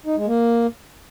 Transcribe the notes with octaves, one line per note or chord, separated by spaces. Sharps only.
D#4
G#3
A#3